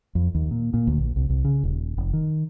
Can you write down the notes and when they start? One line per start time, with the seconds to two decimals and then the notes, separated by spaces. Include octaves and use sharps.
0.15 F2
0.35 D#2
0.51 A#2
0.74 A#2
0.87 D2
0.99 A#1
1.16 C2
1.29 C2
1.45 C#3
1.64 D#1
1.97 F1
2.13 D#3